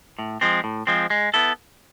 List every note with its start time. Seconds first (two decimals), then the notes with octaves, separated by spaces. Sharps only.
0.19 A2
0.41 F3 G#3 C4
0.64 A2
0.87 F3 G#3 C4
1.10 G#3
1.34 B3 E4 A4